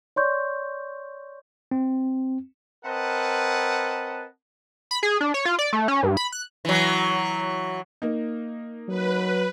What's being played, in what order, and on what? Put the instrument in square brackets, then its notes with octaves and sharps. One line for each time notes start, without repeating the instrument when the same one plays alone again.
[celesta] C#5 D5 C6 C#6 G6
[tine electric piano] C4
[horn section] C4 A#4 B4 D#5 F#5 A5
[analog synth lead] B5
G#4
D4
C#5
F4
D5
A3
C#4
G2
B5
F#6
[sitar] E3 F#3
[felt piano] A#3 D#4
[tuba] F#3 [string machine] B4